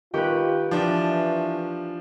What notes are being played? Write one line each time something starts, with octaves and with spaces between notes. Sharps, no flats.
D#3 F4 G4 B4
E3 F3 D4